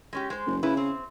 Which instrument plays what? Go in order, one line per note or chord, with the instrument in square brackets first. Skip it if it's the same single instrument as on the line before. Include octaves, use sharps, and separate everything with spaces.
[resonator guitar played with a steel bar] G#3 C#4 G4
G#3 C5
[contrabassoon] F#1
[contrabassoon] C#3 [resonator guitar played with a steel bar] E4 B4
[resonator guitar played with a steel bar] C4